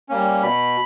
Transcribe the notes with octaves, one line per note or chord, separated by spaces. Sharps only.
G3 A#3 C#4
B2 B5